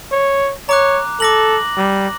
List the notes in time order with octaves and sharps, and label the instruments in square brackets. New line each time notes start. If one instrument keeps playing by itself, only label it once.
[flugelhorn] C#5
[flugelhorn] C#5 [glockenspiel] A#5 D6 F#6
[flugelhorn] A4 [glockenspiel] D6 A#6 F#7
[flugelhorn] G3